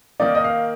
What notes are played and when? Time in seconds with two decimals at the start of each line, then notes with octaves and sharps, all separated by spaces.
0.20 D#3 A#3 D#4 D5
0.35 D#5
0.44 F5